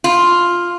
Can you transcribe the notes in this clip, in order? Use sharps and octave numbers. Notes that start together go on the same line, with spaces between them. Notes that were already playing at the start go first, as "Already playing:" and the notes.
F4